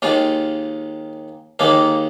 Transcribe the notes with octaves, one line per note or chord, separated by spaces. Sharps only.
D#2 D#3 G#3 F4
D#2 D#3 G#3 A#3